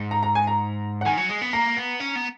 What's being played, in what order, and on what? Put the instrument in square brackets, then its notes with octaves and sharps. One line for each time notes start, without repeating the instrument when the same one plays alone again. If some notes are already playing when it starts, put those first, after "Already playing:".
Already playing: [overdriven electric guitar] G#2
[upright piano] A#5
A#5
G#5
A#5
F#5
[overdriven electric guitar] D#3 [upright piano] G#5
[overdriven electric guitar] F#3
G#3
B3
[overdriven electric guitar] A#3 [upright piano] A#5
[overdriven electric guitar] B3
C#4
B3